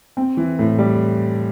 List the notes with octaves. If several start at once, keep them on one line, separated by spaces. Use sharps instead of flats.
C4
E3
A2
G3